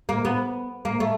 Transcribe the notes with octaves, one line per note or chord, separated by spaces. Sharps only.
A#3
B3
A#3
A3